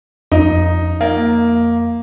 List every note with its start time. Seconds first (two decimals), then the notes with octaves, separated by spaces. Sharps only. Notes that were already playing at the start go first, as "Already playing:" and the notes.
0.32 F2 D#4
1.01 A#3